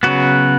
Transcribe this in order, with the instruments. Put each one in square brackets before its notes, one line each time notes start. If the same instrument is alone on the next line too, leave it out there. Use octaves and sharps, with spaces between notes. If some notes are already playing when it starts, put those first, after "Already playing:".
[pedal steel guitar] C#3 F#3 B3 F#4